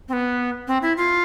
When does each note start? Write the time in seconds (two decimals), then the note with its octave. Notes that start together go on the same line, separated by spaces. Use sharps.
0.09 C4
0.13 B3
0.68 C4
0.82 E4
0.97 F4